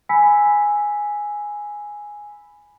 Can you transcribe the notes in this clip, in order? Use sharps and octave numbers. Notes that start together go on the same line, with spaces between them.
G#5 B5 E6 B6